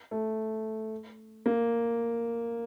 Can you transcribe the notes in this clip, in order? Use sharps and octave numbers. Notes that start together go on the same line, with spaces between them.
A3
A#3